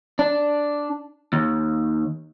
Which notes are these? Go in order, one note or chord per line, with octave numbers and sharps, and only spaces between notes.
D4
D#2